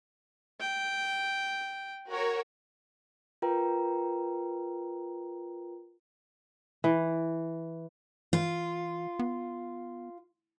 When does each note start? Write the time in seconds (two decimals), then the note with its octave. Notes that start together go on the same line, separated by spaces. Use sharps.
0.60 G5
2.10 F#4 A#4 C#5
3.42 F4 A#4 B4 G5 A#5
6.84 E3
8.33 E3 F4
9.19 B3